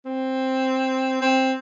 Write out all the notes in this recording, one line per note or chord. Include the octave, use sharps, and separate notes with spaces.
C4
C4